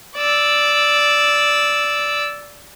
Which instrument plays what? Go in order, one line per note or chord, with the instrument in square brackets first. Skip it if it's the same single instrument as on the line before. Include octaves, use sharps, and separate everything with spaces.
[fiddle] D5 E6